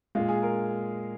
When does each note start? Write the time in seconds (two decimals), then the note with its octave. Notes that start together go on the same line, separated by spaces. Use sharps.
0.15 A#2 G#3 F4
0.29 G#4
0.43 A#4